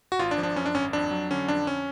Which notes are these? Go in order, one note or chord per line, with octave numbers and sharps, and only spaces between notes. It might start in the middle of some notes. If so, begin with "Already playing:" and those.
F#4
G#1 F4
D4
F3
D4
F#2 C#4
D4
G#1 C#4
F2 D4
F#3
D3 C#4
F2 D4
C#4